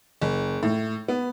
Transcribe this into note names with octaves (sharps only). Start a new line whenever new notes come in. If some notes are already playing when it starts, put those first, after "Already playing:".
F#1
A2
B3